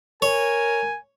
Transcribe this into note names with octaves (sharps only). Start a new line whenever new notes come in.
A#4 C#5 G#5